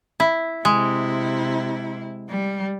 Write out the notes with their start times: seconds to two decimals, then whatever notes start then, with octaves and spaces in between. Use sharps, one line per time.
0.20 E4
0.65 C3 G#3 E4
2.29 G3